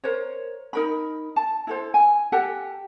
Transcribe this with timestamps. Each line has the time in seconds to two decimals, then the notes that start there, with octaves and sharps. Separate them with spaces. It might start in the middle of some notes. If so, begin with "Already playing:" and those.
0.04 A#4 C5 C#5
0.73 D#4 A#4 B5
1.36 A5
1.67 E4 A4 C5
1.94 G#5
2.32 G4 A4 F#5 A5